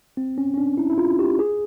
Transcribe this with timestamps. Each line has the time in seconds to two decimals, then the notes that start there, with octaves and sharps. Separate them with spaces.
0.17 C4
0.38 C#4
0.54 C#4
0.58 D4
0.78 E4
0.90 E4
0.98 F4
1.19 G4
1.39 G#4